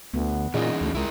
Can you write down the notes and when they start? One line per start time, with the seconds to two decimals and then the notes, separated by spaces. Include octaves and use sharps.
0.14 D2 B3
0.54 A#2 E3 C#4 D#4 G#4 D#5
0.81 D2
0.95 C#2 E4 A#4